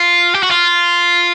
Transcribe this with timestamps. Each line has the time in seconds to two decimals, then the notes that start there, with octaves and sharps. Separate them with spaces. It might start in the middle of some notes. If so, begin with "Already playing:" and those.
Already playing: F4
0.35 G4
0.43 F#4
0.51 F4